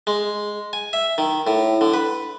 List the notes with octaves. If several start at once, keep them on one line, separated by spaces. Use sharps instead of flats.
G#3
G#5
E5
D#3
A2
D3
B4